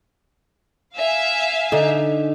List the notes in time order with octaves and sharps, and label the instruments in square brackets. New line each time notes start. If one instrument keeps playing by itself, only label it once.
[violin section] E5 F5 G#5
[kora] D3 D#4